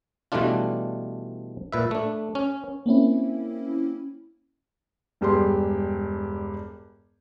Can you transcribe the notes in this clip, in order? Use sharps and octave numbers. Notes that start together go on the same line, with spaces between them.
B2 E3 G3 A3 D4 F4
A#2 B4 E5
A3 D4
C#4
A#3 C4 C#4 E4
E1 G2 G4 G#4 C6